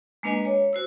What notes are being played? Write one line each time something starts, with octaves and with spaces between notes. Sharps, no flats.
G#3 A#3 D4 B4 D#5 G#5
C#5
F#4 C5 E6